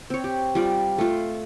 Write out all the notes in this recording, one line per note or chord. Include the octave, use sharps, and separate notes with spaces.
C4 C#5
G4
G3 F4 D5
A3 F4